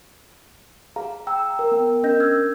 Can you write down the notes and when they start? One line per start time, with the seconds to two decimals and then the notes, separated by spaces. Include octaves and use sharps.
0.96 G#4 F5 A#5
1.27 G5 A#5 E6
1.59 A#4
1.72 B3 G5
2.03 C#4 D4 A#4 D#5 G6 A#6
2.20 E6 F6 G#6